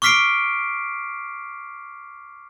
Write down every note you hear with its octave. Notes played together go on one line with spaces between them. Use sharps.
C#6 D6 F6 B6 C7 D7